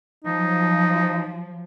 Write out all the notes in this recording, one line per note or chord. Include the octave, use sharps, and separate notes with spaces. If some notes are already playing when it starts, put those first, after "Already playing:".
F3 F#3 D#4